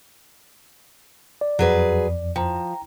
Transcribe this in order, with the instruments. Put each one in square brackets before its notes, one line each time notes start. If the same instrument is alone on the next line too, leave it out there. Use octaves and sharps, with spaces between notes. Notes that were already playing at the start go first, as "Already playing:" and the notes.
[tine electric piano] D5
[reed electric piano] F2 [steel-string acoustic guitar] F#3 G#4 B4
[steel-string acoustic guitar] F3 [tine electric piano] G5 A#5